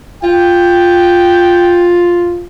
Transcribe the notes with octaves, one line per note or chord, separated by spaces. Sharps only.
F4 G5